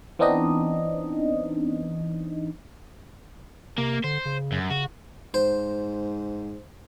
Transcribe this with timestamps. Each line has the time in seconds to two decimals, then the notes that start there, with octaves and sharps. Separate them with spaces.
0.19 E3 B3 C4 D4 D#4 D#5
3.78 C3 A#3
4.04 D3 C5
4.25 C#3
4.52 F#2
4.70 C#3 F#4
5.34 G#2 C5